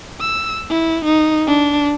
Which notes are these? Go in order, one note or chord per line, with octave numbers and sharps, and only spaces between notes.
E6
E4
D#4
D4